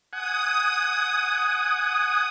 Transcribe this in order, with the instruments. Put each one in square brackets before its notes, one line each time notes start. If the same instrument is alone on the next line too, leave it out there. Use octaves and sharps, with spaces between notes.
[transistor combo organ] F#5 G#5 [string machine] D#6